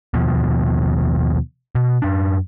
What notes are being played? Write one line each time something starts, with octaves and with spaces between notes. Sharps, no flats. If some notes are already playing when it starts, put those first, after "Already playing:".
D#2 B2 F3
B2
F#2 D4